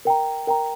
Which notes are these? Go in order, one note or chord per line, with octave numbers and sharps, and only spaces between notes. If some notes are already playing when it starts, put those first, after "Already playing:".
A#4 G5 A#5
A#4 G5 A#5